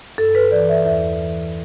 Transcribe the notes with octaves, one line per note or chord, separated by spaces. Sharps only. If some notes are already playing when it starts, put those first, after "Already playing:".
G2 A4
B4
E3 D5
E5
E2 E5
E3